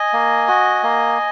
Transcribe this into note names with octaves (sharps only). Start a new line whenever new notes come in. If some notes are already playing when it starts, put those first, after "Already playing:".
Already playing: D#5 G#5
A#3
F#4
A#3